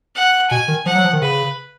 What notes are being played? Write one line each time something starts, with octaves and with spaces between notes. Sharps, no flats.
F#5
B2 G#5
D#3
F3 F#5
F#3
F3
D#3
C#3 B4